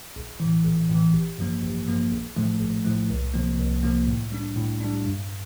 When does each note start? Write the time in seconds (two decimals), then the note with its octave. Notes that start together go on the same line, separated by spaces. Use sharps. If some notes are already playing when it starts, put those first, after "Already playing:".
0.16 A#1
0.40 A2 E3
0.65 A#1
0.90 A2 E3
1.14 A1
1.38 G2 F3 A#3
1.63 A1
1.87 G2 F3 A#3
2.11 A#1
2.36 A2 F3 A3
2.60 A#1
2.84 A2 F3 A3
3.10 C2
3.34 C3 F3 A#3
3.58 C2
3.83 C3 F3 A#3
4.07 A2
4.32 G3 D4
4.56 A2
4.81 G3 D4
5.06 G2